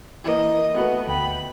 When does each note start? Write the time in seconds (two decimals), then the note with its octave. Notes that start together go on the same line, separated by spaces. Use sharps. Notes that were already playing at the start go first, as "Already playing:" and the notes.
0.24 E3 A#3 D#5
0.75 A3 B3 F#4 B4
1.08 D2 G5 B5